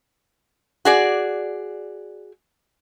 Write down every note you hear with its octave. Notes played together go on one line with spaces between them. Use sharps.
F#4 G#4 D5